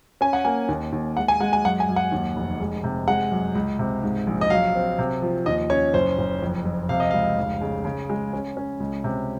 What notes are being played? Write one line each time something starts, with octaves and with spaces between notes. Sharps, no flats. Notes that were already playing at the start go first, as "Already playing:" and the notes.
C#4 G#5
F#5
A#3 G#5
D#2
D#2
G#3 F#5
G#5
G#3 F#5
G#5
F#2 F#5
G#5
F#2
F#5
D#2
F1
G#3
C3
G#3 F#5
F#2
C#2
C3
G#2
A#1
D#5
F#3 F5
C4
C3
F3
D#2 D#5
C#4 C#5
F#1 C5
F#1
F2
F2
C3 F5
D#5
C#2 F5
F1
C#3
C#3
G#3
C#4
C#4
C#2
C3